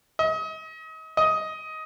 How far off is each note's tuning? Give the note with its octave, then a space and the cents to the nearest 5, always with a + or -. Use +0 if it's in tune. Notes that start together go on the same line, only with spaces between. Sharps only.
D#5 +35
D#5 +15